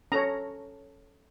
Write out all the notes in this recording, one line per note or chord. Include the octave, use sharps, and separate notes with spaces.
C#4 A4 C#5 A#5